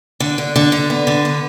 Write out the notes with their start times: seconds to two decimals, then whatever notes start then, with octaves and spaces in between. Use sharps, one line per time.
0.20 D3
0.38 D3
0.56 D3
0.72 D3
0.90 B3
1.07 D3
1.25 B3